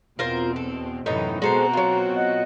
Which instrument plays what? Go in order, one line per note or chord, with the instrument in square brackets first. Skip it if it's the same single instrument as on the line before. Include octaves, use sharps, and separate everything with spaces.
[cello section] E2 B2 C4 [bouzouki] F4 A#4 C5
[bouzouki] A4
[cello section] F#2 C3 E3 [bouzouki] A2 B3 D#4
[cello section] B2 C4 F#4 [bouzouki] G#3 A4 C5 [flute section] A#5
[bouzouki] F#3 F4
[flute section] D#5 F#5 F#6